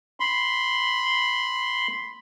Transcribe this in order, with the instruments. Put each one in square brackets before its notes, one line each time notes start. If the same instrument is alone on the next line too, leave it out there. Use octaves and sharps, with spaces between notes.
[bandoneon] B5 C6